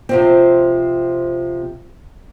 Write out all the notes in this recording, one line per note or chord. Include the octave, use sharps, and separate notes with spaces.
C3 F3 C4